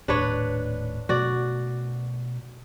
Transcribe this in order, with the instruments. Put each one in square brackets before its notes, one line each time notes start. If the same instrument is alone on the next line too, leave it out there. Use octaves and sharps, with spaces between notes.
[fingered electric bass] D#1 A2 [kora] D4 B4 C#5
[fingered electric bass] B2 A3 [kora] F#4 D5